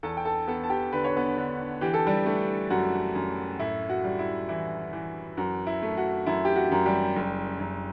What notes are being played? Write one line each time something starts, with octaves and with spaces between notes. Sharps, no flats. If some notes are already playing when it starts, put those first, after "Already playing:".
E2 A4 A5
G5
A4 A5
B3 A4 A5
A5
G4 G5
D3 B4
C#5
B3 B4
D3
E3 G4
A4
G3 G4
A3
F#2 F#4
F#2
A2 E4
F#4
G3
E4
E3 E4
E3
F#2 F#4
E4
A3
F#4
F#2 E4
G4
F#4
F#2
G3 G4
F#1
F#1